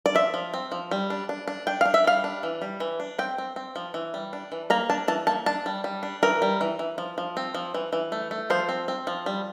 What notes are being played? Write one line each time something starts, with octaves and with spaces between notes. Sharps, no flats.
D5
F3 E5
F3
C4
F3
G3
D4
D4
D4
D4 G5
D4 F5
E5
G3 F5
D4
E3
G3
E3
D4
C4 G5
C4
C4
F3
E3
G3
D4
E3
A#3 A#5
D4 A5
E3 A5
A#3 A5
D4 A5
G3
G3
D4
E3 A#4
G3
E3
E3
F3
F3
C4
F3
E3
E3
A3
A3
F3 C5
C4
C4
F3
G3